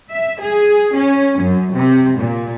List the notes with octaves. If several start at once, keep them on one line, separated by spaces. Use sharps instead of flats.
E5
G#4
C#4
F#2
C3
A#2